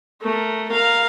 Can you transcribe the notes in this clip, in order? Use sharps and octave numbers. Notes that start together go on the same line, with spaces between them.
A3 A#4
A#4 F5